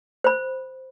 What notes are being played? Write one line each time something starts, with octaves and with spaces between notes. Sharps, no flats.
C5 B5